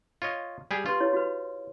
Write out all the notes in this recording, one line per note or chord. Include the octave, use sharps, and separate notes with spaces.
F4 C#5 D#5
G3 G4 G#4
F4 G4 B4 C6
E4 C#5
F#4 B4